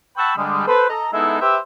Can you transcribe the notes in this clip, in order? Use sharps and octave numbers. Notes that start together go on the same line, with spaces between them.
F#5 G5 A5 B5 C#6 E6
D3 G3 G#3
A4 B4 C5
A4 D#5 A#5
G#3 B3 D#4 E4 A4 E5
G4 B4 C5 E5